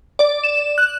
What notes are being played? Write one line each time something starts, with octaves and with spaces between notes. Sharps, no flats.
D5
E7
F#6